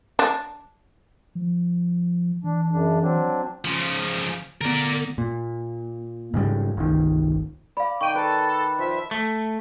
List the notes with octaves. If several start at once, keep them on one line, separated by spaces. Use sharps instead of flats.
D4
F3
E3 D4
F#2 C#3 D4
F#3 C4 D4
C#3 F3
D3 B3 A#4 D5
A#2
G#2 C#3 G3
G1 C2 D#3
D5 F5 B5
D#3 G5 C#6 D#7
A4 B4
F3 E5
A3